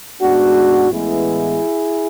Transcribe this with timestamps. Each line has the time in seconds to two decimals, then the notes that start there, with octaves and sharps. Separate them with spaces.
0.21 G#2 G#3 B3 D4 F#4
0.91 A1 A2 E3 G#3 B3 E4 G#4